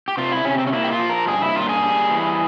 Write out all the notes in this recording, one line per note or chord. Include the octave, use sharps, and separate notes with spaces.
G4
C3 F4
E4
C3 C#4
C4
C#4
A#3 E4
G4
F4
F3
A#4
G2 G#4
E4
A#3 F4
G#4
G3
E3